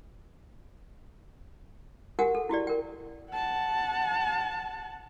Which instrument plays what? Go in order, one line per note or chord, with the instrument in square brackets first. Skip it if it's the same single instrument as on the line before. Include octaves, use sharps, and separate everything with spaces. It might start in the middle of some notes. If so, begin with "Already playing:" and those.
[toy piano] F#4 G4 A#4 F#5 G#5
A4
E4 F#4 G4 D5
A#4 G5
[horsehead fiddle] F#5 A5